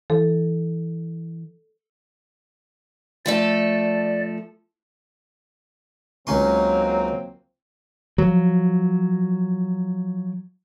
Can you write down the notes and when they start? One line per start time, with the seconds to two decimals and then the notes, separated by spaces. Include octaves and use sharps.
0.10 E3 A4
3.26 F3 A3 A4 D5
6.27 C#2 F#3 A#3 C4 C#4 D#4 C6
8.18 F3 F#3